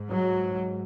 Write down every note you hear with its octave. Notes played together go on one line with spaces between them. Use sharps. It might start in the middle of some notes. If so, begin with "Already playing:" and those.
Already playing: G#2
F#3